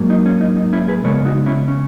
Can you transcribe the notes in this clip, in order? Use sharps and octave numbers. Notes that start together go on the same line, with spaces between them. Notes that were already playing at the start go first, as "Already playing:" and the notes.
Already playing: G#2 F#3 A#3
D#4
C#4
D#4
D#4
C#4 E4
G#4 B4
C#3 G#3 B3 A#4 C#5
D#4 F#4
C#4 E4
C#4